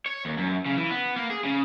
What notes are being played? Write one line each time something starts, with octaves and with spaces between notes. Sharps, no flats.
C#5
D#2
F#2
C#3
E3
B3
A#3
G#4
C#3